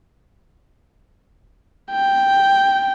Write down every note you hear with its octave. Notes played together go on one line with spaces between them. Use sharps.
G5